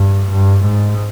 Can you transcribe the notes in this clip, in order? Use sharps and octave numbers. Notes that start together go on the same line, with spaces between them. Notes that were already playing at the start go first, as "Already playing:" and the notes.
Already playing: G2
G2
G#2